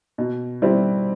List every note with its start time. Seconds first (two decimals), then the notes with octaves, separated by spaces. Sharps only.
0.18 B2
0.62 G3 C4 E4